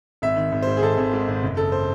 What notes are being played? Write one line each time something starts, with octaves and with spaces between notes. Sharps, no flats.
G#1 E5
D#3
G#1
G#2 C5
G#4
G#1 A4
G#1
G#2
G#1
F#1
F#1 A4
C5